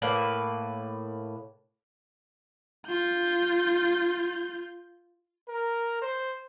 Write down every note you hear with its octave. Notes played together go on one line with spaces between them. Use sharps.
A2 A#3 B4
F4 G6
A#4
C5